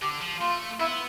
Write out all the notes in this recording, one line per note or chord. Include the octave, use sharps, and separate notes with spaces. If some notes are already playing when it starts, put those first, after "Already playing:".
D3 G4
F3
A3 F4
B3 E4